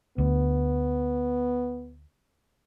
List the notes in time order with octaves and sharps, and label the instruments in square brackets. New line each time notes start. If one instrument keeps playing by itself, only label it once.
[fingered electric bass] D2 [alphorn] B3